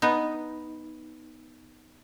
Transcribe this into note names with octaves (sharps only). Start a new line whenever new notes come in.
B3 D#4